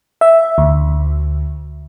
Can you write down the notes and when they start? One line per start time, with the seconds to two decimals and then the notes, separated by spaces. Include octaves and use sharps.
0.21 E5
0.58 D2